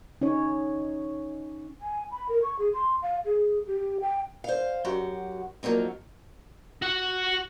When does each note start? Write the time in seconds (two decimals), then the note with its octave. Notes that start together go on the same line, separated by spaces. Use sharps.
0.21 C#4 D#4 C#5
1.81 G#5
2.11 B5
2.28 A#4
2.43 C#6
2.59 G#4
2.74 C6
3.02 F5
3.25 G#4
3.67 G4
4.01 G5
4.44 C5 F5
4.85 F#2 F#4 G4 F#5
5.63 F3 F#3 A#3 C4 D#4
6.82 F#4 F#5